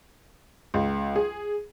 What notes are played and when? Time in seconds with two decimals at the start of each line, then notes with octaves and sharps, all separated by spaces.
0.74 C#2
1.16 G#4